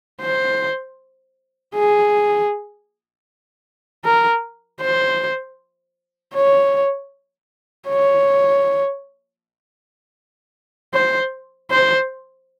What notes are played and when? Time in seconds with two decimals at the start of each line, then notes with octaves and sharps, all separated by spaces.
0.21 C5
1.75 G#4
4.05 A#4
4.81 C5
6.35 C#5
7.88 C#5
10.94 C5
11.71 C5